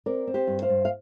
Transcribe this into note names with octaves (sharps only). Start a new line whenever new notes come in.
C4 A#4 D5
C4
G4 C5
G2
C5 F5
G2
F5